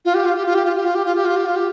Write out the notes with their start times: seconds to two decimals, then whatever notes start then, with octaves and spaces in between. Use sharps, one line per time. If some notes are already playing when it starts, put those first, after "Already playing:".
0.05 F4
0.15 G4
0.25 F4
0.36 G4
0.46 F4
0.55 G4
0.65 F4
0.76 G4
0.85 F4
0.95 G4
1.05 F4
1.15 G4
1.25 F4
1.36 G4
1.46 F4
1.56 G4